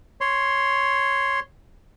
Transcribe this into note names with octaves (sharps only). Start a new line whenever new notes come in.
C#5 C6